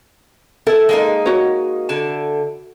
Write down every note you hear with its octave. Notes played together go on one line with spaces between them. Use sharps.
E4 A4
G#3 A#3 D#4
F#4 C#5
D3 E4 A5